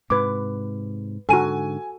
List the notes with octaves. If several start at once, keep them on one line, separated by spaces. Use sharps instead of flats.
G#2 C3 B4 D6
G#2 D3 F#4 A4 G#5 D#7